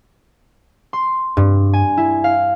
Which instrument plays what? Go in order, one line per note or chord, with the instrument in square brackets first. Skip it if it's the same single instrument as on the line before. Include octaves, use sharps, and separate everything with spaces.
[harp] C6
G2
G#5
E4
F5